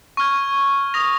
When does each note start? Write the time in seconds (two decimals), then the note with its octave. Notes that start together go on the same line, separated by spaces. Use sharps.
0.17 C#6 F6 G#6
0.94 D#6 A#6 F7